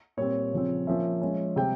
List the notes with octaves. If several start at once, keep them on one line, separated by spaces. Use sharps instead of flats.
A#2 G3 C4 C#5
C#3 F3 C4
F3 A#3 C#4 E5
F3 G#3 C#4
C3 G3 C4 G5